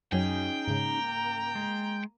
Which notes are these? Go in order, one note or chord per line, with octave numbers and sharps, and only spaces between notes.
F#2 F#3 C#4 D#4 G#4 G5
G#2 C#3 A#3 A#5
G#3